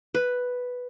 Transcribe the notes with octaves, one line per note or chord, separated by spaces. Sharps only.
B4